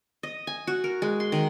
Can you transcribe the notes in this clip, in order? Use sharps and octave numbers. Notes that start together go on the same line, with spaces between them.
D#5
G#5
F#4
A#4
G#3
C6
D#3